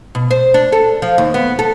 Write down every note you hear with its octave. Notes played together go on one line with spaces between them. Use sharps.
B2
C5
D4
A4
F3
D#2
B3
A4